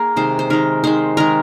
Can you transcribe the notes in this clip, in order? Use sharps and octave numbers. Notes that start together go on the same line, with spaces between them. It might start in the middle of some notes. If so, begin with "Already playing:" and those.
Already playing: A#3 G#4 A#4
C3 D#3 G#3 C5
C5
D#3 G#3 A#4
D#3 G#3 C5
D#3 G#3 A#4